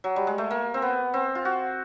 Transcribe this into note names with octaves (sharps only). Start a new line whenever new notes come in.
F#3
G3
G#3
A3
A#3
C4
B3
C4
F4
F#4